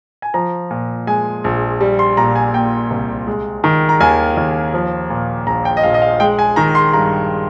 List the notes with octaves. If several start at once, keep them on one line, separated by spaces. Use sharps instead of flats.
G#5
F3 A#5
A#2
G#3 G#5
A#1
G3
C6
A#2 A#5
G#5
A#3 G5
C2
G#3
D#3
A#5
D#2 G#5
D#2
F3
A#2
A#1 A#5
G5
D#5
A#1 F5
D#5
F5
G#3 G5
G#5
D#3 A#5
C6
G2 A#5